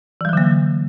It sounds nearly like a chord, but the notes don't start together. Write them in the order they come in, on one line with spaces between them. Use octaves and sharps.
E3 G3 F#3 D3 A#3